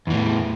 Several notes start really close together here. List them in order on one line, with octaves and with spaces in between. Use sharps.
E2 E3 A2